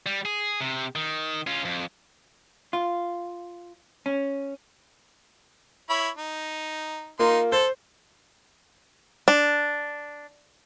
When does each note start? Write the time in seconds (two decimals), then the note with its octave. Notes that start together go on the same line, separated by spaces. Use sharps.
0.06 G3
0.25 G#4
0.61 C3
0.96 D#3
1.47 C#4 F4
1.65 F2
2.73 F4
4.06 C#4
5.90 E4 C#5 B5
6.17 D#4
7.19 A#3 D#4 F4 C6
7.52 A4 C5
9.28 D4